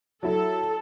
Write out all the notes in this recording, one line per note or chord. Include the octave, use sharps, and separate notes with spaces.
F#3 E4 A4 A5